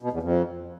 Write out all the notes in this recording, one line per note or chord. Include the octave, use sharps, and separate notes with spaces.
B2
E2
F2